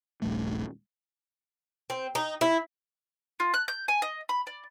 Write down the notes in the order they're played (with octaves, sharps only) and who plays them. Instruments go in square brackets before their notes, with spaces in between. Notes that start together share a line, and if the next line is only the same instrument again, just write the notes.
[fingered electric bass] D#1 A#1 G2 A3
[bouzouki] C4
D#4
E4
[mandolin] F4
F#6
G6
G#5
D#5
B5
D5